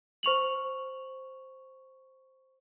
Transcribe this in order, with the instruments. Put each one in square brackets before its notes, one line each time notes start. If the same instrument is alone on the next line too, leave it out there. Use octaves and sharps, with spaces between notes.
[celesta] C5 C#6 F7 F#7